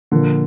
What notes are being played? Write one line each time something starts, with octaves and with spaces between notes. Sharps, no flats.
A#2 D3 F3 A#3